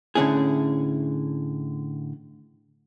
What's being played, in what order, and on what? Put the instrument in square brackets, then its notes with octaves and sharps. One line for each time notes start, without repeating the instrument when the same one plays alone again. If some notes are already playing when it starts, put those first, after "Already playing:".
[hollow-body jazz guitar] A2 D3 C#4 E4 G#4